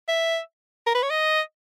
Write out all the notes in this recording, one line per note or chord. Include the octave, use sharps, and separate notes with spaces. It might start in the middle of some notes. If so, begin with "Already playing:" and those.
E5
A#4
B4
C#5
D#5